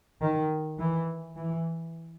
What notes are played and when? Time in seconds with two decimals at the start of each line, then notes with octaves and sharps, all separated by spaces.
0.22 D#3
0.78 E3
1.37 E3